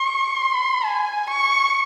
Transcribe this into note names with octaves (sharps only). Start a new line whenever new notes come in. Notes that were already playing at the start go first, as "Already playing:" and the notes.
Already playing: C#6
C6
G#5
C#6